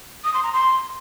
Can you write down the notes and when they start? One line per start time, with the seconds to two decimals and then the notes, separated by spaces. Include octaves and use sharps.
0.24 D#6
0.34 C6
0.43 A#5
0.53 C6